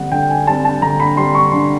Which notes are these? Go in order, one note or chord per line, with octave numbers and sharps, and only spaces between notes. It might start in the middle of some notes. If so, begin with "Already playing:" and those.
Already playing: D3 G3 C4 F#5
D3 G5
G#5
G3 C4 A5
A5
D3 A#5
B5
G3 C4 C6
C#6
D3 C6